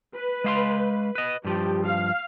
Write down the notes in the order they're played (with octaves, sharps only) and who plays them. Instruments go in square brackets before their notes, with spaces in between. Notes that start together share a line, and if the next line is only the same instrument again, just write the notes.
[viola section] B4
[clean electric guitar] G#3 F5 C6
B4 D#5
[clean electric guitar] G2 F3 [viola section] G4
[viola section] F5